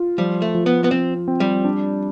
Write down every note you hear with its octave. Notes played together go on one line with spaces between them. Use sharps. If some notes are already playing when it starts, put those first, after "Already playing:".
Already playing: F4
F3 G3
A3
F3
B3
B3
F3 C4
C4
G3
D4